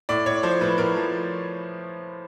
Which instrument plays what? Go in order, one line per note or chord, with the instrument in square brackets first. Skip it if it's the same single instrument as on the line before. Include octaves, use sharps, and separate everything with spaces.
[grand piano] A2 D5
A2 C#5
F3 C5
A2 B4
A2 A#4
F3